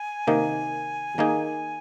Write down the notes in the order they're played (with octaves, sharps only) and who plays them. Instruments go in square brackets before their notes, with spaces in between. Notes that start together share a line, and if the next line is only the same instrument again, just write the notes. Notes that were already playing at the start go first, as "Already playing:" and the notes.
Already playing: [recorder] G#5
[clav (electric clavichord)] C3 D#3 A#3 D#4
D#3 A#3 D#4 G#4